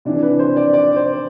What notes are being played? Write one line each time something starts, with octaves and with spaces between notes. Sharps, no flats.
C3 E3 D4
B4
C5
D5
D5
C5